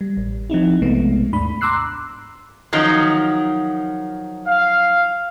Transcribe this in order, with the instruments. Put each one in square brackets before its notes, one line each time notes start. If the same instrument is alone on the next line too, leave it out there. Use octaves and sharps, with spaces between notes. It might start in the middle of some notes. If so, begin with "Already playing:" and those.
[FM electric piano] G3
A1
F3 C4 D#4 E4
B1 C3 G#3 A3 B3
D#2 G#2 D4 B5
A#5 C6 D6 E6 F#6 C7
[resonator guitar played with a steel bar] D#3 F3 F#3
[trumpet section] F5